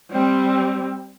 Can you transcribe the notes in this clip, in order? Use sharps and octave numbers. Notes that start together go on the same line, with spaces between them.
G3 C4